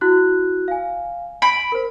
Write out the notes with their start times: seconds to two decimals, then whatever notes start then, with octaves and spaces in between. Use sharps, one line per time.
0.01 E4 F#4 F#6
0.68 F5 G#5
1.42 B5 D7
1.72 A#4 C5